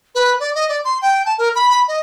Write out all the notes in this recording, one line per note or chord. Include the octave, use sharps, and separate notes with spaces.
B4
D5
D#5
D5
C6
G5
A5
A#4
B5
B5
D#5